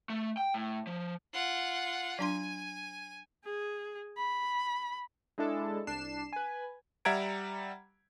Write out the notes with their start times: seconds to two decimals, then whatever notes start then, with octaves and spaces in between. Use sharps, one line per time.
0.10 A3
0.37 G5
0.54 A2
0.87 F3
1.33 F4 F#5
2.19 F#3 D4 G#5 C6
3.44 G#4
4.17 B5
5.38 G#3 D4 E4 A4
5.87 C2 D4 C7 E7
6.33 B4 G#5
7.05 G3 E5 F#5 A#5 G#6 D7